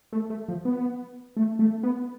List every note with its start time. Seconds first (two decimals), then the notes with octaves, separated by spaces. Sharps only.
0.13 A3
0.30 A3
0.48 F3
0.65 B3
1.37 A3
1.59 A3
1.83 B3